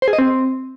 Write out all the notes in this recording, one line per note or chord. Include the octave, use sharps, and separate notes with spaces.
C5
G#4
D#5
C4